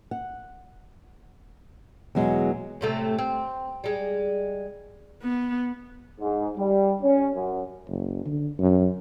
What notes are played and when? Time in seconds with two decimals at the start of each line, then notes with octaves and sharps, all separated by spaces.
0.11 F#5
2.15 E2 B2 F#3 G#3
2.81 A2 C3 A3
3.19 C4
3.84 G3 G#3
5.23 B3
6.20 G#2
6.57 G3
7.02 C#4
7.35 F#2
7.88 F#1
8.26 D3
8.59 F#2